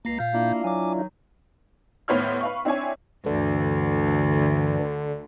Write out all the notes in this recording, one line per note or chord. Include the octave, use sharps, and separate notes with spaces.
C#2 A#3 A#5 C7
A#2 F5 G6
A#3 D4 E4 F4
F#3 G#5 D6
D#3 D#4
D#2 A2 B3 C5 C#5 F6
B4 F5 C#6
C4 D4 E4 C#5 G#5
D2 G2 D3 E3